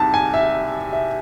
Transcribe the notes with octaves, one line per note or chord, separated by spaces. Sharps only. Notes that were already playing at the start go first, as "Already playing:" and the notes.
Already playing: C2 C3 D#3 A5
G#5
E5
E5